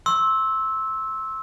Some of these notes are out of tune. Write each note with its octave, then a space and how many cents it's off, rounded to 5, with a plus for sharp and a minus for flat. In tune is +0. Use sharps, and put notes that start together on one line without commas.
C6 +35 E6 -10